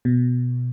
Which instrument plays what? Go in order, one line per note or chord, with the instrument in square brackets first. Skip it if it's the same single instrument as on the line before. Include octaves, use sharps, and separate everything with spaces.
[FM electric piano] B2